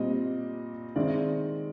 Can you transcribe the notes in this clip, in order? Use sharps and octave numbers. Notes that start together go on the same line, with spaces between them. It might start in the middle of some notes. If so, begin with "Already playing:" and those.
Already playing: A#2 G3 C4 D#5
D#3 G#3 C4 D5 E5